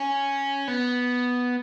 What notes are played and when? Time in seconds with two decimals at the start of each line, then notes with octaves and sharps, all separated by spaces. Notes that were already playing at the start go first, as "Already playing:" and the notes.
Already playing: C#4
0.68 B3